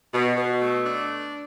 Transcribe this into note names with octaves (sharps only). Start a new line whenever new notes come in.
B2
B2
A3
D4